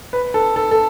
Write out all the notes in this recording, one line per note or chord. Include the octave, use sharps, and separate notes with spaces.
B4
A4
A4
A4